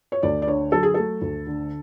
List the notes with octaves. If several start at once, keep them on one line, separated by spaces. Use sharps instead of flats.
C#5
D2 D5
D5
D3 C#5
F#3 A4
G#4
A3 A4
D2
D3